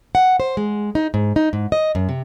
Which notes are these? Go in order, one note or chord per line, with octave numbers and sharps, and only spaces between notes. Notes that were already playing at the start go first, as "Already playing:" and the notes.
F#5
C5
G#3
D#4
G#2
D#4
G#2
D#5
F#2
C3